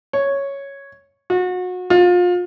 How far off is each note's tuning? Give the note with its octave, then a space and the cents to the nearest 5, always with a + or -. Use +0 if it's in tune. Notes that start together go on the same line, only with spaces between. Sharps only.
C#5 +0
F#4 -30
F4 +30